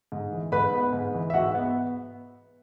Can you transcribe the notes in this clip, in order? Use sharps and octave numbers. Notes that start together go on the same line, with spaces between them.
G#2
E3
G#2 B4 B5
B3
G#2
E3
E5
G#2 F#4 F#5
B3